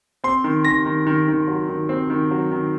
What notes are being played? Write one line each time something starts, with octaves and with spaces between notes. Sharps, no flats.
C4 C6
D#3
D#3 A#6
D#3
D#3
D#3
F#3
D#3
C4
D#3
F#3
D#3